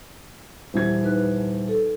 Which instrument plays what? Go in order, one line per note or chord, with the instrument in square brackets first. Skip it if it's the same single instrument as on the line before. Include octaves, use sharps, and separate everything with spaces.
[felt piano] D#1 E3 G#6
[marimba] D#4 B4 F#6
A4